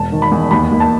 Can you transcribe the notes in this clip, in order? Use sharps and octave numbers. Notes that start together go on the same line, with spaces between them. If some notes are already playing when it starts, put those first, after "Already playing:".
Already playing: E1 A5
D#3
B5
E2
D#2 B5
D#2
A5